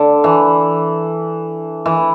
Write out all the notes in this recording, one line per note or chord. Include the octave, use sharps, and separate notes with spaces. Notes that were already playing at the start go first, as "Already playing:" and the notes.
Already playing: D3
E3
E3